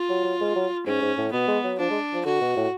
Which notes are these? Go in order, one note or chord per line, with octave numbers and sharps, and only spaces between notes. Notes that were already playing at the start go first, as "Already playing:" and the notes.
Already playing: F4
F#3
F#3
G#3
F#3
G#2 C#4
G#2
A2
B2 B3
G#3
F#3
F3 D4
G#3
F3
D3 F#4
B2
A2